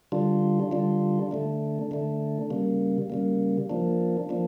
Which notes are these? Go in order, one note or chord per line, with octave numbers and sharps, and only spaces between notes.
D3 G3 D4 F4
D3 G3 D4 F4
D3 A3 D4
D3 A3 D4
C#3 G3 A#3
C#3 G3 A#3
F3 A#3 D4
F3 A#3 D4